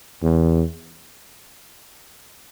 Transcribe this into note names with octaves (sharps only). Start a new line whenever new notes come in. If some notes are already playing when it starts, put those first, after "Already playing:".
E2